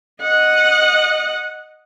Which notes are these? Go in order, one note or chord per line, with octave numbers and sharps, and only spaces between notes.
D#5 F#5